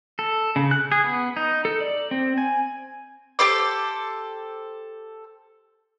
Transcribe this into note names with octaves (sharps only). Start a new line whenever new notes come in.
A4
C#3
F#6
G#4
B3
D#4
A4
D5
C4
G#5
G4 A4 C5 D6